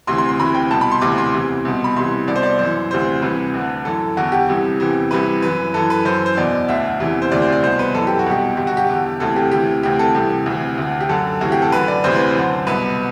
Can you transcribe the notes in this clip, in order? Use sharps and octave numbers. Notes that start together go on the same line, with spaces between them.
D2 C3 E3 C6
C6
C6
D2 C3 E3 B5
G5
C2 B2 A5
B5
C6
D2 C3 E3 D6
C6
E2 C3 E3
C2 B2
B5
C2 C3 E3 C6
C2 B2 D5
C5
D5
F#2 E3 C5
D2 C3 E3 C5
C2 C3 E3 B4
D2 D3
F#2 E3 A4
E2 D3 F#4
G4
C2 C3 E3
E2 C3 E3
C2 C3 E3 B4
F#2 E3 B4
F#2 E3 A4
B4
F#2 E3 C5
C5
E2 B2 D5
D2 D3 E5
E2 C3 E3
C5
D2 C3 E3 D5
C5
D5
C2 B2 C5
B4
F#2 E3 A4
G4
F#4
C2 B2 G4
G2 D3 G4
F#4
G4
E2 D3
D2 C3 E3 A4
G4
D2 C3 E3 G4
D2 C3 E3 G4
A4
C2 C3 E3 G4
D2 C3 E3
D2 D3
G4
F#2 D3 A4
D2 C3 E3 F#4
G4
A4
F#2 D3 B4
D5
D2 C3 E3 C5
B4
C5
F#2 D3
C2 B2 B4